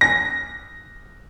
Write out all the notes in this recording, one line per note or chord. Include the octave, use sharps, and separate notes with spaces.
A#6